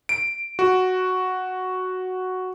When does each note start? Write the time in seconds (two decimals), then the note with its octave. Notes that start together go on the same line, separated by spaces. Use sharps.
0.09 D7
0.59 F#4